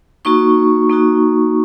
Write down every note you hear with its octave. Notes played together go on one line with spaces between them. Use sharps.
A#3 D#4 F#4 C#6
A#3 D#4 F#4